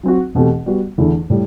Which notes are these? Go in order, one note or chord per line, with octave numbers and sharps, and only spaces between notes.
F#3 C4 F#4
E2 B2 A3 C4 G4
G3 B3 F#4
E2 D3 A3 E4
A2 G3